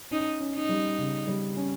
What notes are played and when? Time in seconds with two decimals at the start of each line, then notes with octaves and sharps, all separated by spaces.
0.11 C#4 D#4
0.40 C#4
0.54 D#4
0.69 G3
0.98 C#3
1.27 G3
1.57 C#4